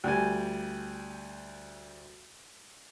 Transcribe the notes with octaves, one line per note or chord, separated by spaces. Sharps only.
D2 G3 G#5